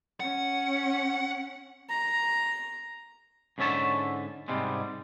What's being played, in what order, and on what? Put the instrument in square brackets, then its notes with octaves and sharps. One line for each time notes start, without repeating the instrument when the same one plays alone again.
[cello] C#4 [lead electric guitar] F#5
[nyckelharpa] A#5
[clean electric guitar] G#2 D3 C#4 C#5 E5 A5
G#2 C3 G3 G#3